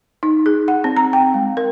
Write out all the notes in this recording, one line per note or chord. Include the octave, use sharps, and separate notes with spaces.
D#4
G#4
F#5
C4
A#5
G5
G#3
A#4